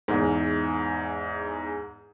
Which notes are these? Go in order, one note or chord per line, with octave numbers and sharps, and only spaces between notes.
E2 G#2